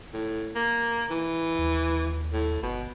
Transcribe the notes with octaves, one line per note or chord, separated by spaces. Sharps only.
A2
A#3
E3
D#2
A2
G1 B2